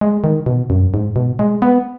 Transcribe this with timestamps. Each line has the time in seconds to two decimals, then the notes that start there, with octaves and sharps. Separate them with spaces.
0.01 G#3
0.24 D#3
0.46 B2
0.70 F#2
0.94 G#2
1.16 B2
1.39 G#3
1.62 B3